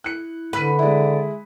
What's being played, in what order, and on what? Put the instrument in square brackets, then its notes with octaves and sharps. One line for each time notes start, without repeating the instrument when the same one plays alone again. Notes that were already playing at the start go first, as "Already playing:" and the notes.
[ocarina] E4 [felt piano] F#6 C#7
[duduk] D3 [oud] B4 [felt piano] B5 B6 D#7
[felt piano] G#3 E4 [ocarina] D5